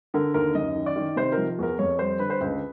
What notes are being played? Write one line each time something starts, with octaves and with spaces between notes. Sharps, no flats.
D3 A#4
D#2 A#4
F#2 D#5
D#3
D5
D#3
C3 C5
F3 A#4
E2 A#4
F2 C#5
G3 C5
D3 B4
C5
C#2 B4